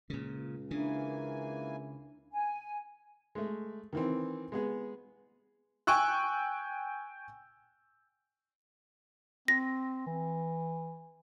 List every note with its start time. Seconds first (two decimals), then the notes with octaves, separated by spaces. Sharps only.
0.10 C#2 A#2 C#3
0.71 C#3 E3 A#3 D4 G#5
2.32 G#5
3.35 G#3 A3
3.93 D#3 E3 C4
4.52 G#3 B3 G#4
5.87 G5 G#5 C#6 E6 F#6
9.48 C4 A#6
10.07 E3